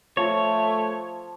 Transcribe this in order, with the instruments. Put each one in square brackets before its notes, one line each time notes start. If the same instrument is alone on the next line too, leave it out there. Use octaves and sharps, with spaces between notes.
[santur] F3 A5 E6 [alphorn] A3 [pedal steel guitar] C#5